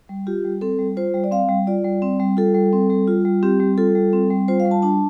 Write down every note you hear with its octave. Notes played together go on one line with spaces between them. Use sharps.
G3
F4 G4
G3
C4 A4
G3
F4 C5
G3
D5
C4 F5
G3
F4 D5
G3
C4
G3
F4 A4
G3
C4
G3
F4
G3
C4 G4
G3
F4 A4
G3
C4
G3
F4 C5
F5
G3
A5
D4 A5